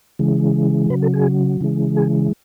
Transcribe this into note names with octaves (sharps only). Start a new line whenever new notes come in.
C#3 E3 G#3
C#3 F#3 B4
A4
G#4
C#3 E3 G#3
G#4